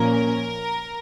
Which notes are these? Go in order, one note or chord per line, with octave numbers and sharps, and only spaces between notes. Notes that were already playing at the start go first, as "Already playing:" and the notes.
Already playing: A#2 F3 A#3 C#4 A#4